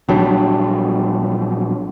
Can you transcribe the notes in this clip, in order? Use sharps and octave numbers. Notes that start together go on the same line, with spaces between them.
A#1 F#3 G3 D4